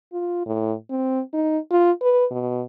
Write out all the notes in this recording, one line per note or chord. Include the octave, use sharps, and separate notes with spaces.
F4
A2
C4
D#4
F4
B4
B2